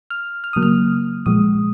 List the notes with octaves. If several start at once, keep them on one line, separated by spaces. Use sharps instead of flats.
F6
F6
C#3 F#3 A#3 D#6
F6
A#2 F3 G#3 D#6